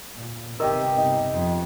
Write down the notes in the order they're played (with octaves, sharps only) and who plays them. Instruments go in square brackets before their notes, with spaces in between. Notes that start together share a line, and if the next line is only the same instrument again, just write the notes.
[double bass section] A#2
[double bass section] G1 C3 B3 [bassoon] D#3 [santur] G4 D#5 E5
[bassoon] D#4
[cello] F2